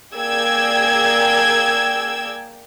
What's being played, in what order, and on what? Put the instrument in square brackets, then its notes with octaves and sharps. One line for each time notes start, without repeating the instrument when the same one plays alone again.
[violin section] A#3 G#4 D5 G5 E6 G#6